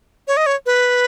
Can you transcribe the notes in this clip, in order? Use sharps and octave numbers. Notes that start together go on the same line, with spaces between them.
C#5
D#5
C#5
B4